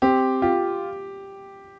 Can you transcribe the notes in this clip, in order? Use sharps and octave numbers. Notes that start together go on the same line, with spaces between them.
C4 G4
F4 G4